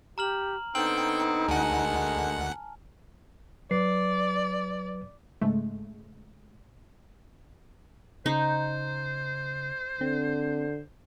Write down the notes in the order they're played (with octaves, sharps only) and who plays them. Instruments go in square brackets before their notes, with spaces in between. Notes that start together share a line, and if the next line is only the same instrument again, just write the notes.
[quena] G4 [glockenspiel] A#5 F6 F#7
[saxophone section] D3 B3 C4 [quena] D#4 [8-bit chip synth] G5 [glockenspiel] F#7
[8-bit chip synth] D2 F#5 [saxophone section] D3 D#3 G#3 [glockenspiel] G#5 A5
[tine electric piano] F#3 B4 C7 [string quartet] D5
[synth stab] G#2 C#3 G#3 A3
[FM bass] C#3 [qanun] D#4 [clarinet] C5
[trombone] D3 [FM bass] C4